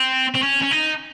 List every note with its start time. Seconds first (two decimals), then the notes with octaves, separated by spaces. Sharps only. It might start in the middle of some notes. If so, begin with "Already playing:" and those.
Already playing: C4
0.35 C4
0.43 C#4
0.62 C#4
0.71 D#4